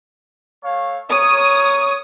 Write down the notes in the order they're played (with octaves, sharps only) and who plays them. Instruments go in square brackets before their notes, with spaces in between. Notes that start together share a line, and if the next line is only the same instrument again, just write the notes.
[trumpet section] A3 C#5 F5
[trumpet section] A#4 C#5 [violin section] D#6